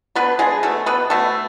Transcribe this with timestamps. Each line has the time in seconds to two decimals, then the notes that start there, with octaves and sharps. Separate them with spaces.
0.15 D3 B3 B4
0.39 D3 G#3 G#4
0.63 B2 A3 A4
0.86 B2 B3 B4
1.10 B2 A3 A4